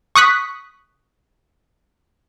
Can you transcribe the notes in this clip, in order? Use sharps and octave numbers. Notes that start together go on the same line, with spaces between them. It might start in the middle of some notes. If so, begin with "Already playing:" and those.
C#6 D#6 F#6 B6